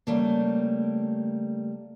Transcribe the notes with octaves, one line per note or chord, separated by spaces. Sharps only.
C#3 G3 A3 A#3